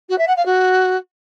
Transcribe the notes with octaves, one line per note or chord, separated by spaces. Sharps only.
F#4
E5
F#5
F5
F#4